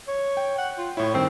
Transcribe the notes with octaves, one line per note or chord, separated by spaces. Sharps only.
C#5
G5
F#5
F4
A2 E4 C#5
G2 D#3 C4